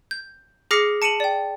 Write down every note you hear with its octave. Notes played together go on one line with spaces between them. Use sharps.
G6
G#4 D6 F6 A#6 C7 C#7
A5 C#7 D#7 E7 F#7
D5 G5